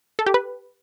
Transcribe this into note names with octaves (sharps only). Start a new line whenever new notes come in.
A4
G4
B4